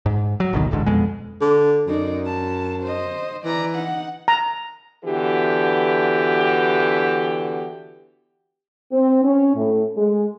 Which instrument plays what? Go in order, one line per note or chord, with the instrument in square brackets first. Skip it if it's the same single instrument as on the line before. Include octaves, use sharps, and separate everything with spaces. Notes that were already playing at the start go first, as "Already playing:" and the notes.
[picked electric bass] G#2
F#3
G#1 D2 B2 D#3
D1 A1 G#2 D3
F2 B2 G#3
[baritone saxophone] D3
[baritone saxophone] F#2 [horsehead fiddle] D#4 D5
[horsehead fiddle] A5
C5 D#5
[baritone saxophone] E3 [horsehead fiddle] D5 A#5
[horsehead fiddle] D#4 F#5
[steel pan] A#5
[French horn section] D3 E3 B3 F#4 G4
C4
C#4
A2
G#3